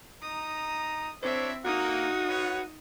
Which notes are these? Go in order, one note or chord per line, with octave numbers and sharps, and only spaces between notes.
D#4 A#5 D#6
C4 D4 E4 C5 C#5 E5
A#3 D#4 F#4 D#6
B4 C#5 F#5